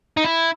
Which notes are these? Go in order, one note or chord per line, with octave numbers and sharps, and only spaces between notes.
D#4
E4